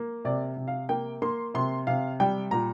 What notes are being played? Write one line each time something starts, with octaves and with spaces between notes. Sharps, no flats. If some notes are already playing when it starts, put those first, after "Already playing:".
Already playing: A#3
C3 D5
C3
F5
A#3 G5
A#3 C6
C3 C6
C3 F5
G3 G5
A#2 A#5